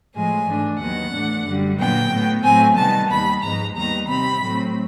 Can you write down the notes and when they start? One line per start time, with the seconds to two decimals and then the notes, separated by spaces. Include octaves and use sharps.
0.15 A2 F3 G#3 G#5
0.47 G#2 E3 A3 D4
0.80 D#2 D#3 F#3 B3 F#5
1.13 A2 E3 A3 D4
1.45 F#2 D3 G3
1.78 A#2 F#3 B3 G5
2.11 A2 F#3 B3
2.43 A2 F#3 A3 C4 G#5
2.76 C3 D#3 G3 B3 A5
3.10 D#2 D#3 G3 B5
3.42 G#2 F3 G#3 B3 A#5
3.75 D#2 D#3 G3 B3 A#5
4.07 C3 D#3 G3 C4 B5
4.41 A2 F#3 A3 C4